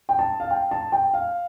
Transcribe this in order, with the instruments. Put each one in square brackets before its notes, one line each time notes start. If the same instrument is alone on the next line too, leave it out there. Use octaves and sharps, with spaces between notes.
[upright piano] G5
A5
F5
G5
A5
G5
F5